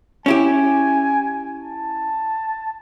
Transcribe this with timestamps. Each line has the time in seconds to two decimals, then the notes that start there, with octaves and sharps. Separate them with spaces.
0.26 C#4 E4 G4 G#5
1.60 A5